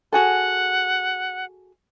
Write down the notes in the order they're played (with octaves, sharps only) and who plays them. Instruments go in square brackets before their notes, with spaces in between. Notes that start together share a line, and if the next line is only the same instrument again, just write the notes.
[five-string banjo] F#4 G#4 A4 [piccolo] F#5